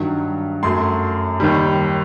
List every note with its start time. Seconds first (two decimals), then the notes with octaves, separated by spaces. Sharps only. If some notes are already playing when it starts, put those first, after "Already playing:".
Already playing: G2 D#3 F#3
0.63 F#2 F#3 A3 C6
1.40 D#2 D#3 G3